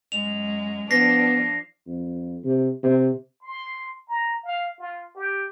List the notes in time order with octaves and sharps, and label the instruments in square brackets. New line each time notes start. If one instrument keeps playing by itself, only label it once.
[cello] F#2 G#3 [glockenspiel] F7
[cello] F3 D4 [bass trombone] B3 [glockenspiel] A#6 C7
[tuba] F2
C3
C3
[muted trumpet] C6
A#5
F5
F4
G4